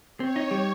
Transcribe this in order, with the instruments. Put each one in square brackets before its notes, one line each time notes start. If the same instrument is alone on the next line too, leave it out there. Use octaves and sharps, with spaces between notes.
[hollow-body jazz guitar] C4 [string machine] C#5
[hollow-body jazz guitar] D#4
G3